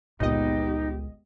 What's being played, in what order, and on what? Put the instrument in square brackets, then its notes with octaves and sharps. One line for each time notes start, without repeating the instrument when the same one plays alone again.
[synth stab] G1 A#2 D#5 [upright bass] C#2 [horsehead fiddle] B3 G4 [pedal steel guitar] D#4